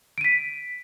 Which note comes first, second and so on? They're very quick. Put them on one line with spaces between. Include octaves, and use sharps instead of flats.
D7 D#7 B6